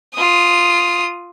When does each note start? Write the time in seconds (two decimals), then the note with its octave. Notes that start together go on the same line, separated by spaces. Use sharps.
0.15 F4 D#6